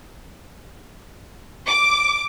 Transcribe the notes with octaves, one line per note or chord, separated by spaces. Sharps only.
D6